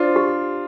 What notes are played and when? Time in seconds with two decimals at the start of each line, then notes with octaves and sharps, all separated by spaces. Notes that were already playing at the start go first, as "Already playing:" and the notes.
Already playing: D4 F4 C5
0.16 G4